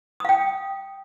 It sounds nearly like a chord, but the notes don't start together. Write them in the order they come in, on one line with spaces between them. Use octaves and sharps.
D#6 F5 G5